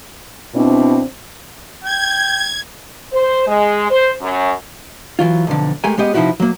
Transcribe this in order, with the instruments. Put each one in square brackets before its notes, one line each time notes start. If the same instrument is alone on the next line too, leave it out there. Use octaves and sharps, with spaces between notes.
[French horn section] B2 C4 D4 E4
[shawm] G5 [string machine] G#6
[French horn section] C5
G#3
C5
F#2
[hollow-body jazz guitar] E3 F#3 F4
B1 F2 D3
G#3 A3 G4 A#4 G#5
G#3 B3 G4 D#5
C3 F3 D#4 E4 F#4 B4
F#3 A#3